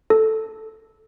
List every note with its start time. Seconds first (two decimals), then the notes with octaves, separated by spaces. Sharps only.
0.10 A4